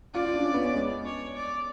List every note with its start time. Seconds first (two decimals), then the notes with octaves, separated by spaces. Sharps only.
0.14 F4 D5
0.25 F4
0.34 D4
0.44 C#4
0.54 B3
0.65 C#4
0.74 G#3
1.05 C#5
1.35 D5